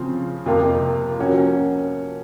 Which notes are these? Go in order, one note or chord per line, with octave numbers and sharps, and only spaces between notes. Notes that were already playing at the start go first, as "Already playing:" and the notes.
Already playing: C#3 F3 C4
F2 C3 F3 A#3 F4
F3 A#3 C#4 F#4